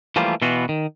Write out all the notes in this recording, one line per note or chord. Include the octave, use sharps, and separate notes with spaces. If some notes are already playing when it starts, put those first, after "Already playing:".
E3 F3 G3 A3 A#3 F4
B2 E3 B3 F4 F#4
D#3